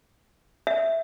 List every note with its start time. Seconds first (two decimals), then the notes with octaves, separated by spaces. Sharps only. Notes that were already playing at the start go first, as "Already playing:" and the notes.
0.67 E5